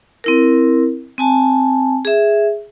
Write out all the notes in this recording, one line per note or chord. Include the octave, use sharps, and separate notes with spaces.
C4 E4 A#4
C4 G#5 A5
G#4 E5